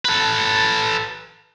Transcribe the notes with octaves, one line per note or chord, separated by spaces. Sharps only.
A4 B4